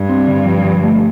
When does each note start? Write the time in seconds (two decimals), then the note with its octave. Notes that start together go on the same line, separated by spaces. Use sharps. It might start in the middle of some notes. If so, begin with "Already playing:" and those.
Already playing: G2
0.09 C4
0.28 D3
0.46 F3
0.65 F3
0.83 A3